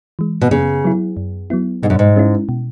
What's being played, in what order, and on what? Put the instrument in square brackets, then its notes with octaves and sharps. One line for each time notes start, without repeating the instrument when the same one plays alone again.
[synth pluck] E3 G#3
[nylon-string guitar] B2
[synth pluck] F#2 [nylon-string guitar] C#3
[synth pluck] F#3 B3 E4
F#2
F#3 B3 E4
[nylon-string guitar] G#2 [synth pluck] B2
[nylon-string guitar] F#2
G#2
[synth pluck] G#3 C#4 E4
B2